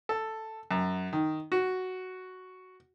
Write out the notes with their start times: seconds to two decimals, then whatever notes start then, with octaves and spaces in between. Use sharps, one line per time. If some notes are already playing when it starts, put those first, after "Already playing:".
0.09 A4
0.71 F#2
1.13 D#3
1.52 F#4